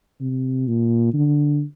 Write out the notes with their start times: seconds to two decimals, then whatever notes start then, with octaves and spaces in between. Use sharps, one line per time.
0.20 C3
0.68 A#2
1.14 D3